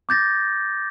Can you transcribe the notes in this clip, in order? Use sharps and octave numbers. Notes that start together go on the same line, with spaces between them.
D6 G6 A6 A#6